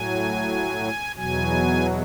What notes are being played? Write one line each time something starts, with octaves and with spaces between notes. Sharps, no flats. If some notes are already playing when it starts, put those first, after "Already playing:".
Already playing: A2 F#3 G#5
E2 B2 F#3 G#5